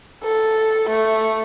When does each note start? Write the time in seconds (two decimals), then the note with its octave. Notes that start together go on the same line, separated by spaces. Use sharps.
0.23 A4
0.90 A3